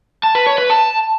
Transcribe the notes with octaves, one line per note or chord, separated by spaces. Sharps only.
A5
B4
C#5
B4
A5